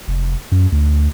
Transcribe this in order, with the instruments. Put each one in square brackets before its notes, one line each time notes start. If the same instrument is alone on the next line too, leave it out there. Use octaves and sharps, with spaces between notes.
[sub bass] F1
F#2
D2